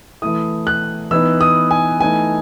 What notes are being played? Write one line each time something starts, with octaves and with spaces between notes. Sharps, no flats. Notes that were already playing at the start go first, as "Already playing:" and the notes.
E3 A3 E4 D#6
F#6
E3 B3 D#4 E6
D#6
G#5
E3 A3 D#4 G#5